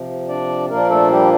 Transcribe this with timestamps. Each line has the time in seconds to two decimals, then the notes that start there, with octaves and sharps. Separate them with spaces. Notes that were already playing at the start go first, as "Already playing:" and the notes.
Already playing: C3 F3
0.29 D4 D5
0.70 A#2 F3 A#3 D4 A#4
0.90 A3 A4
1.11 G3 G4